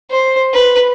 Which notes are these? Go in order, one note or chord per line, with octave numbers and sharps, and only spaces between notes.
C5
B4